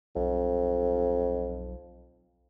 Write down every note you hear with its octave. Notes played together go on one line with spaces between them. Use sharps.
B1 F2